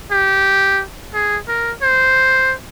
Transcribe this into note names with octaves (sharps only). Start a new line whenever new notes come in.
G4
G#4
A#4
C5